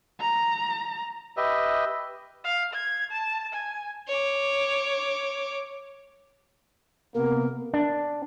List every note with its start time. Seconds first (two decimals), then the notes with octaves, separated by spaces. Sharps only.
0.20 A#5
1.37 G4 B4 D#5 E5
2.44 F5
2.73 G#6
3.11 A5
3.53 G#5
4.08 C#5 D6
7.15 C3 A#3 B3 A#4
7.74 D4